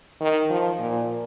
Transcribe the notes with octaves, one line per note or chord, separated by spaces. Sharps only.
D#3
F3
A#2